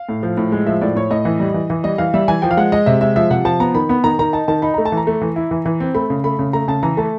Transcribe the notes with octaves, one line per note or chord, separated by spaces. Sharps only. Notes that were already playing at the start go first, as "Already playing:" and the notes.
Already playing: F5
A2
F3
A2
G#3
F3 E5
A2 D5
A2 C#5
A2 D#5
E3
G3
E3
E3
G3 D#5
E3 F5
G3 E5
E3 G#5
F3 G5
F5
G#3 F#5
G#3 D#5
C3 E5
G#3 E5
F3 E5
C3 F#5
F3 A5
B3 A#5
D#3 B5
B3 B5
D#3 A#5
D#3 A#5
D#4 A5
D#3 A5
D#4 B5
A3 A#5
A5
E3
A#5
A3
E3
E4
E3
E3
C4
A3 B5
C#3
A3 B5
C#3
A3 A#5
C#3 A5
E3 A#5
A3 A5